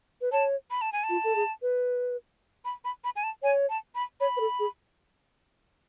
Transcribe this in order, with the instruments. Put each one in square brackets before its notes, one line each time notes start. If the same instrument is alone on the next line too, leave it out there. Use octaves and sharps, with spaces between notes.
[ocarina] B4
[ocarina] C#5 [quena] A5
[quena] B5
A5
G#5
A5
[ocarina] F4
A4
G#4
B4
[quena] B5
B5
B5
G#5
A5
[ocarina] C#5 [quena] G#5
[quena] A5
B5
[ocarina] C#5 [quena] B5
[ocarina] B4
A4
G#4